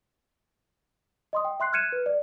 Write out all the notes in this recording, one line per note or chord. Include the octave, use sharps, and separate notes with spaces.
D#5 C6 D#6
G5
E5 C6 F#6 C7
F6 F#6 G#6 C#7 D#7 E7
B4
D5